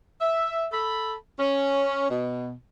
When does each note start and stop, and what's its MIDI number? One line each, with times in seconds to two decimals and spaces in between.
0.21 0.66 76
0.72 1.14 69
0.72 1.14 83
1.39 2.07 61
2.10 2.52 47